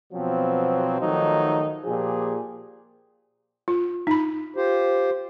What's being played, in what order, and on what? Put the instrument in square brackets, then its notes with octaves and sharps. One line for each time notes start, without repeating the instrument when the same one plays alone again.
[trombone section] B2 F3 F#3 B3 C4
D#3 F3 F#3 A3 D#4
A#2 F3 G4 G#4
[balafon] F4
D#4 B5
[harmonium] F4 G4 C5